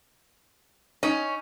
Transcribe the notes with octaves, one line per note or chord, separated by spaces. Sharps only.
C#4 D#4